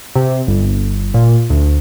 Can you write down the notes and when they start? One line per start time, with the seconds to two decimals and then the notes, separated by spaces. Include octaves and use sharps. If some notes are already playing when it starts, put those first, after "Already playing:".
0.16 C3
0.47 G1
1.14 A#2
1.50 D2